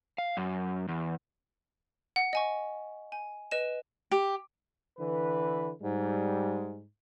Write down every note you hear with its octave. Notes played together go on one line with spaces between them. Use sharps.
F5
F#2
E2
F#5
D#5 G#5 C#6
G#5
B4 D#5 D#7 E7
G4
D3 E3 B4
G#2 G3 G#3